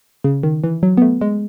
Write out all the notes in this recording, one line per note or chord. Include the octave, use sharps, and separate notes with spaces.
C#3
D#3
E3
F#3
B3
A3
G#3